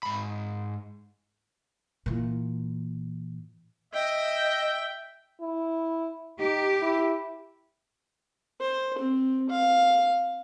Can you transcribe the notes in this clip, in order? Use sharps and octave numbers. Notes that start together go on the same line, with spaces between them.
G#2 B5
A#2 E3
D#5 E5 G5
E4
D#4 G4
E4
C5
C4
F5